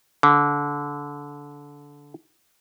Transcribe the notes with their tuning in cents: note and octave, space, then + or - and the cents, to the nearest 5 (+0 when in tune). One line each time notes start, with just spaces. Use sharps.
D3 -20